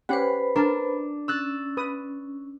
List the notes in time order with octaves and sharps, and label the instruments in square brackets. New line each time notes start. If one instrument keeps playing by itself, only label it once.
[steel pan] C#4 G4 F#5 [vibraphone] B4 C5 B5
[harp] D4 [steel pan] A#4 A5
[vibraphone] C#4 [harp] E6 F#6 A6
[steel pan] B4 D#6